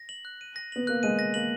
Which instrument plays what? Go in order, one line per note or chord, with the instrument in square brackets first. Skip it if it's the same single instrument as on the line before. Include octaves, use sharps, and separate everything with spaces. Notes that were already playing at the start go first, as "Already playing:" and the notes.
Already playing: [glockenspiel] A#6
F#7
F#6
D#7
A#6
[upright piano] B3 [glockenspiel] F#7
[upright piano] A#3 [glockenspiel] F#6
[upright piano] G#3 [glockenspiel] D#7
[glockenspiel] A#6
[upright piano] A#3 [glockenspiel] F#7